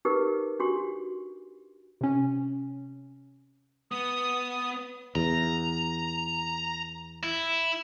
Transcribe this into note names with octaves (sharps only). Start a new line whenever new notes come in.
D#4 G4 G#4 A#4 B4
D4 F#4 G4 C6
C3 C#4
B3 D#6
E2 A#5
E4